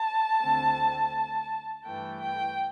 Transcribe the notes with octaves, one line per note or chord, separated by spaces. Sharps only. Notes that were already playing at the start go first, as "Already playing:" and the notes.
Already playing: A5
D2 D3 A3 C4
G2 E3 A3 G5
G5